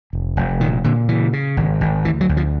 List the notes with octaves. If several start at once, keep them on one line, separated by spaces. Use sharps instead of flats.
F1
F1
A#2 D#3
A#2 D3
C#3 E3
C#3
G#1
G#1
D2 E3
F#3
D2
F3